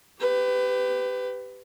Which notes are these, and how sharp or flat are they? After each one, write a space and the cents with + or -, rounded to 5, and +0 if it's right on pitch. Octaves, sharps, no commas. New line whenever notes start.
G4 +0 B4 +25